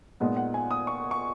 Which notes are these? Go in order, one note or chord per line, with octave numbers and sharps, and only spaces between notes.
A#2 G#3 B3 D#4 D#5
F#5
G#5
D#6
C#6
C#6